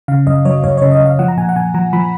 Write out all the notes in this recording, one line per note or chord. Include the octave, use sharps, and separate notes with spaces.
C#3 F5
F#2 D#5
F#3 C#5
F#2 C#5
C#3 C#5
D#5
F#2
F5
F3 F#5
A#5
A#2 G#5
F#5
A#2 G#5
F3 A#5
F3 B5